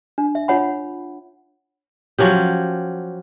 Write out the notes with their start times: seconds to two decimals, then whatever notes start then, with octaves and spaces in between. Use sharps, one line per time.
0.18 D4
0.35 E5
0.48 D4 F4 C#5 F#5 B5
2.19 F3 F#3 C#4 G4